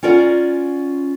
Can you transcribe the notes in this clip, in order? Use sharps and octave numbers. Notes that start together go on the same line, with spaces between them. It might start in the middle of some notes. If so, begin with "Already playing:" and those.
C#4 F4 A#4 D5 F#5